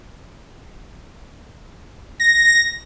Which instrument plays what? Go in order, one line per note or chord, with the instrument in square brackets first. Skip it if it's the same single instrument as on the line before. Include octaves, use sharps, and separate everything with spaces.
[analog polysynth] A#6